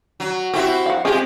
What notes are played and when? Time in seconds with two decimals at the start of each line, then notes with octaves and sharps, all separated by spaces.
0.20 F#3
0.54 C4 E4 F#4 G4
0.86 F5 F#5
1.05 G#3 C4 F4 G4 G#4